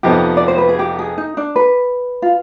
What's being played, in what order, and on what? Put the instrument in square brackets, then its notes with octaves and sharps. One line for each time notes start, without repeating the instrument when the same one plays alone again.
[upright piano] F2 C3 F3 B3 D#4 [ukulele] G4
[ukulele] D5
C5
B4
G#4
G4
G#4
D#4
D4
B4
F4